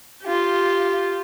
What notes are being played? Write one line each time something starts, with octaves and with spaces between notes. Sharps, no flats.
F4 G4